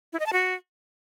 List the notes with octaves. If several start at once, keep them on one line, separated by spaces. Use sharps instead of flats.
E4
D#5
A5
F#4